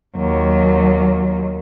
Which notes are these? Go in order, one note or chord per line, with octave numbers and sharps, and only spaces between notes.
D#2 F#3